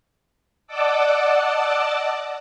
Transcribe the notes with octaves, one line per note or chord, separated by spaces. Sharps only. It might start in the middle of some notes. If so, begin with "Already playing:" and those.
D5 D#5 F#5 A5 D6 E6